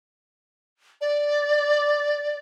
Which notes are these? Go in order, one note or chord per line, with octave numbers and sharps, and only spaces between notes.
D5